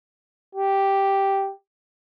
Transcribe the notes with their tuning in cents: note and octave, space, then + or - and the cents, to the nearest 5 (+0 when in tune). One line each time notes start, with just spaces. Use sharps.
G4 -5